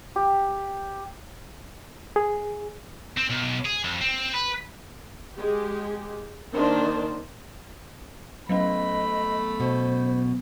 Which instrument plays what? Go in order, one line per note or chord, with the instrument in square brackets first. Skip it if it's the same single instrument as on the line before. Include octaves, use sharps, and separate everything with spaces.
[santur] G4
[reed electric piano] G#4
[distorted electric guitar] C4
B1
G#4
F2
C4
B4
[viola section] G#3 G4
D#3 A#3 D4 C5
[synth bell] F#3 B3 C#4 [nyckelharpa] A3 B5 [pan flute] D#5
[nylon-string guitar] B2 [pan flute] C5